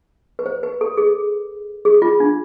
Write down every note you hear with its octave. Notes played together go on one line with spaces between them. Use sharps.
B4
C5
B4
A4
G#4
G#4
F4
D4